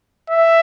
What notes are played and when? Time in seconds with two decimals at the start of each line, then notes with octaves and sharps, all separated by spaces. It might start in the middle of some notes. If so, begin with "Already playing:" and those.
0.30 E5